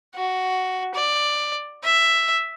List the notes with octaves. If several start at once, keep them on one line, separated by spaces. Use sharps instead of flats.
F#4
D5
E5